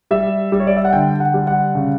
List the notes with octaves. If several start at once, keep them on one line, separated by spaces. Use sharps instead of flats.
G3 E5
G3
C#5
D5
E5
F#5
D3 G5
F#5
G3
F#5
C#3